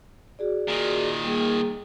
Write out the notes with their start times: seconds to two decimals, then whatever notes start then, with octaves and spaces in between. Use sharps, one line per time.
0.39 F#4 G#4 D5
0.68 A#2 D#3
1.24 G3 A#3 G#4